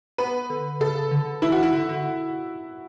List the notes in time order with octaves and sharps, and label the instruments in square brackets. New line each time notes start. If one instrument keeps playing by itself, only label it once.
[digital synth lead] B3 [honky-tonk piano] B4
[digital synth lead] D3
[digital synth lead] C#3 [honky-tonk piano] A4
[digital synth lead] D3
[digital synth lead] E3 [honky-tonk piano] E4
[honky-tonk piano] F#4
[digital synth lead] E3
[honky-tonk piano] E4
[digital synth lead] D3
D3